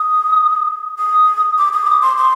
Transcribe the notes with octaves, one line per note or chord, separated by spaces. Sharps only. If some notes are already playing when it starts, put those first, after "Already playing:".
Already playing: D#6
D#6
D6
D#6
D6
C6
C6